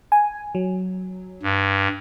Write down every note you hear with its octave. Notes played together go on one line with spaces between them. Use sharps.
G#5
F#3
G2